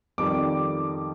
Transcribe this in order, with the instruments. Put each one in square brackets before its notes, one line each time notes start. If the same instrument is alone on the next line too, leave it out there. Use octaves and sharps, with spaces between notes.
[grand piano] F2 D#3 G3 D6